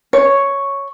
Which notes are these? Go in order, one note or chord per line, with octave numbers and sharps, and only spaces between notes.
C#5